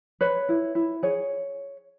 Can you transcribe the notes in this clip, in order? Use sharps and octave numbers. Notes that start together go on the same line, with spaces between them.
B4 C#5
E4
E4
G#4 C#5